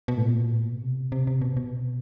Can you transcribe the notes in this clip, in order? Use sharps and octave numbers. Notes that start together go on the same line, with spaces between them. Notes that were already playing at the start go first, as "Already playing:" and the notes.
B2
A2
A#2
A2
A#2
B2
C3
C3
C3
B2
B2